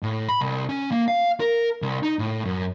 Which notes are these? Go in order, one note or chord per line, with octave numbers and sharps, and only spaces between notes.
A2
B5
C2
C#4
A#3
F5
A#4
C2
D#4
A2
F#2